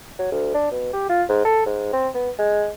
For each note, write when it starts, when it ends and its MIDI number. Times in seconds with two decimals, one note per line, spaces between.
0.19 0.27 54
0.32 0.50 38
0.54 0.71 62
0.71 0.92 47
0.93 1.06 67
1.09 1.23 65
1.29 1.41 44
1.45 1.63 69
1.66 1.90 44
1.93 2.08 60
2.15 2.30 59
2.39 2.69 56